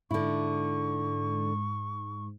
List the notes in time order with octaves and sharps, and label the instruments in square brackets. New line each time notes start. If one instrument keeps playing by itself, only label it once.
[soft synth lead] G#2 [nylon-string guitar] D3 E4 [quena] C#6